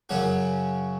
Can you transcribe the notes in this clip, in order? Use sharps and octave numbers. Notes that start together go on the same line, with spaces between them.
F#2 C#3 F#3 C#4 F#4